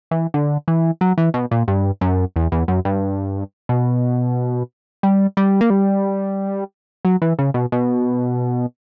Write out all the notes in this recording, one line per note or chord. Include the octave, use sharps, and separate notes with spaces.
E3
D3
E3
F#3
E3
B2
A#2
G2
F#2
E2
E2
F#2
G2
B2
G3
G3
A#3
G3
F#3
E3
C#3
B2
B2